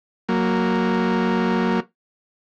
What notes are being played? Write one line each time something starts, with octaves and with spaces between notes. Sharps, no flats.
F#3 A#3